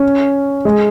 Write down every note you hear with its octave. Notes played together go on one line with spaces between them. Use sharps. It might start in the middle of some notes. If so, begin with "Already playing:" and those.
Already playing: C#4
G#3